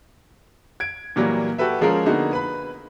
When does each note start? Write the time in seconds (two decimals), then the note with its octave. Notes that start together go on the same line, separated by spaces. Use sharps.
0.80 G#6 D7
1.16 A#2 E3 F#3 G3 A#3
1.58 F#4 G4 A4 B4 E5
1.81 F3 G#3 C#4 F4 G#4 A#4
2.05 D3 A#3 B3 D#4 F#4 G#4
2.33 B4 B5